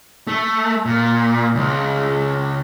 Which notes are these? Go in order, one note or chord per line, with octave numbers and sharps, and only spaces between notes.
A3
A#2
C#2